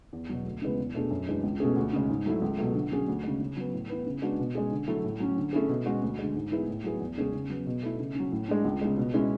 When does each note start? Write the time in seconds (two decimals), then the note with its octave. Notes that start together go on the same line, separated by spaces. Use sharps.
0.13 E2
0.29 B2 F#3
0.45 D2
0.62 C#3 E3 G#3 B3
0.78 E2
0.95 B2 A3 D4 G#4
1.11 F#2
1.27 E3 G#3 D4
1.43 C#2
1.60 B2 A3 C#4 G#4
1.76 D2
1.93 C#3 G#3
2.09 G#2
2.26 F#3 A3 E4
2.42 C#2
2.59 B2 F#3 A3
2.74 D3
2.91 F#3 C#4 G#4
3.08 D2
3.24 C#3 G#3
3.40 C#3
3.57 F#3 B3
3.73 A2
3.89 E3 B3
4.06 C#3
4.22 G#3 B3 D4 F#4
4.39 B2
4.55 G#3 C#4 G#4
4.71 D3
4.88 F#3 A3 E4
5.04 A2
5.20 F#3 C#4
5.37 D3
5.53 A3 C#4 E4 G#4
5.69 B2
5.86 G#3 C#4 F#4
6.02 D2
6.19 D3 G#3
6.36 G#2
6.51 E3 B3 E4 G#4
6.68 A2
6.84 F#3 B3 E4 G#4
7.00 E2
7.17 C#3 G#3 C#4 G#4
7.33 C#3
7.50 F#3 B3
7.67 B2
7.83 A3 E4
7.99 C#3
8.15 F#3 C#4
8.32 A2
8.48 G#3 D4
8.65 C#2
8.81 C#3 G#3
8.97 B2
9.14 G#3 C#4 E4